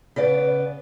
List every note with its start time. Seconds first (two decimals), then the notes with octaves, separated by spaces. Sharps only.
0.16 C#3 B3 D5